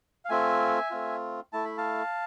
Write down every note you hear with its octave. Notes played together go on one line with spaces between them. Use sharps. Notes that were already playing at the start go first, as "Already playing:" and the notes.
F5
A3 C4 F4 E5 G#5
A3 C4 F4
A3 E4 A5
B5
F5 A5